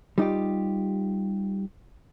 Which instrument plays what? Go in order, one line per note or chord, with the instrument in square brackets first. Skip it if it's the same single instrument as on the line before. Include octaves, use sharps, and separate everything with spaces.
[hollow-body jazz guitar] G3 D#4 F4 G4